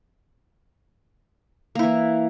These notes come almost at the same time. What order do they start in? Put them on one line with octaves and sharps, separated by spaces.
A#3 E4 E3